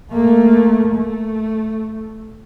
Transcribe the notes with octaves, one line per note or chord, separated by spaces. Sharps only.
A3 A#3
A3